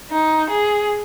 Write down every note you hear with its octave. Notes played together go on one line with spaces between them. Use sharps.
D#4
G#4